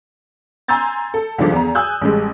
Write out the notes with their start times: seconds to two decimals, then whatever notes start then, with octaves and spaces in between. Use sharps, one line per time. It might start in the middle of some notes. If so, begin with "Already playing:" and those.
0.68 G#5 A#5 C6 E6 G6 A6
1.14 A4
1.38 C#2 G2 D#3 F3 A4 D6
1.52 E2 A#5
1.75 G#5 D#6 E6 F#6 G6
2.01 A1 G3 G#3